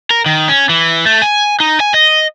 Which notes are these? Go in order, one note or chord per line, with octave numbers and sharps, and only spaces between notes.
A#4
D#3
C#4
E3
A3
G#5
D#4
G#5
D#5